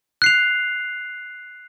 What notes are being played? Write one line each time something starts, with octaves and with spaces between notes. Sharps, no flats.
F#6 C7 F7